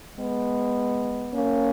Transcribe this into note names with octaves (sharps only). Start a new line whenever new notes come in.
G#3 B3
A#3 C#4